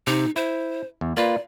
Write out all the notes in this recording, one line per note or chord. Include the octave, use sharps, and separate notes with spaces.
C3 D#4
E4 C5
E2
A#3 F4 B4 D5